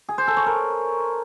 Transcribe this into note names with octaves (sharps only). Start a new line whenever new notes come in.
G#4
C5
A4
C#5
A#4